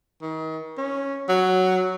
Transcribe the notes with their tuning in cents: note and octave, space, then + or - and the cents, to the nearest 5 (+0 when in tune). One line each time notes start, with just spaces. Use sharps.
D#3 +35
C#4 -5
F#3 +5